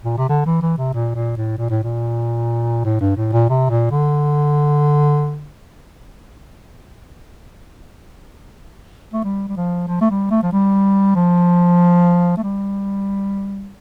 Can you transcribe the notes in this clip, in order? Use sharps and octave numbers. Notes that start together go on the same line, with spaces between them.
A#2
C3
D3
E3
E3
C3
A#2
A#2
A2
A#2
A2
A#2
A2
G2
A2
A#2
C3
A#2
D3
A3
G3
G3
F3
F3
A3
G3
A3
F3
G3
F3
A3
G3